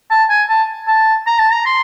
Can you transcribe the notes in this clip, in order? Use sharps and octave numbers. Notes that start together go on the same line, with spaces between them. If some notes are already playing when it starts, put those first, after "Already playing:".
A5
G#5
A5
A5
A#5
A5
A#5
C6